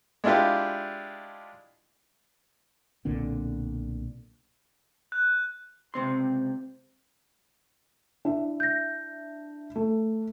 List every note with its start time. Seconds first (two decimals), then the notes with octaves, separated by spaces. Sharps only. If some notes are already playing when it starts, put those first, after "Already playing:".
0.24 G#3 D4 E4 F4 G4
3.05 B1 A#2 D3 C4
5.12 F#6
5.94 C#2 C3 C4 C6
8.25 D4 E4 E5
8.60 G6 A#6
9.76 A3